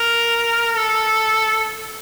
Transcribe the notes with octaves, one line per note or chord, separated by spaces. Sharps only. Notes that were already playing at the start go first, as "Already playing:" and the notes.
Already playing: A#4
A4